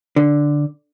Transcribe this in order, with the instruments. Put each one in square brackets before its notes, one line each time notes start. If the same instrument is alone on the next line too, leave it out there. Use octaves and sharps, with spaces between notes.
[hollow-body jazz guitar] D3